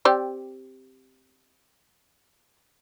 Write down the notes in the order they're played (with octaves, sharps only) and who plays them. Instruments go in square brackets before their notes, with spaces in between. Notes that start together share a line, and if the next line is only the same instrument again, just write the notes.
[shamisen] C4 G4 D5